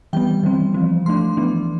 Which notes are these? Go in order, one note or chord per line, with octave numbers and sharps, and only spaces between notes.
E3 G3 B3 G5
E3 G3 C4
F3 C4
F3 A3 D4 C6
E3 B3 D4